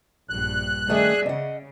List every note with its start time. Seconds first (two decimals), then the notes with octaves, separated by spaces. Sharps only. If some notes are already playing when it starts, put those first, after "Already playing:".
0.30 A#1 G2 F#6
0.89 D#3 A3 C#4 G#4 D5 E5
1.26 C#3 D#5 F#5